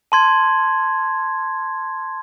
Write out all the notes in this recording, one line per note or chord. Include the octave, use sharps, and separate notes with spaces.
A5 C6 G#6